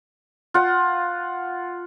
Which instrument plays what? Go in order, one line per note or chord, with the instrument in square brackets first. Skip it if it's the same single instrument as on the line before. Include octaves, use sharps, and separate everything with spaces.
[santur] F4 F#5